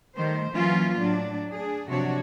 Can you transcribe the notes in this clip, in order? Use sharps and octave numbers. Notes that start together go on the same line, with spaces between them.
D#3 G3 A3 C5
E3 F#3 A#3 C#4 F4
A2 F#3 D4
D4 G#4
C3 F3 F#3 D4 F#4 C#5